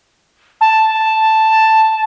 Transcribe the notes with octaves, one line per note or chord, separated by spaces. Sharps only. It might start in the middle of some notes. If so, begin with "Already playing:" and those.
A5